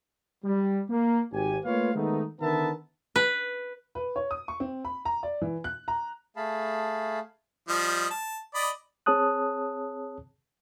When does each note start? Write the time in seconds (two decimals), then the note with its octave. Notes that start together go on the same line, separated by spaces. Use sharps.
0.44 G3
0.89 A#3
1.32 G#1 G4 G#5
1.64 A3 A#3 F4 B4 C#5 F5
1.94 D#3 G#3 A3 B3 D#4
2.41 D3 D#3 B3 A#4 E5 A5
3.16 B4
3.95 B4
4.16 C#5
4.31 D#6
4.48 C#6
4.60 C4
4.85 B5
5.05 A#5
5.23 D5
5.42 E3
5.64 F#6
5.88 A#5
6.36 A3 G#4 F5 A5 B5
7.69 F3 G3 D#5
8.10 A5
8.54 D5 D#5 B5
9.06 C4 G#4 C#5 A5 D#6 F#6